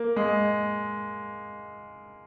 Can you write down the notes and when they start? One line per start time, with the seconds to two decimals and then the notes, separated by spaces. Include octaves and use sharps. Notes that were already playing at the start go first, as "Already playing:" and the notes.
Already playing: A#3
0.16 G#3